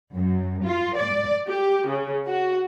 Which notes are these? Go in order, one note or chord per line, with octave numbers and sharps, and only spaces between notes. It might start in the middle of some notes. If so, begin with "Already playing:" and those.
F#2
F4
D5
G4
C#3
F#4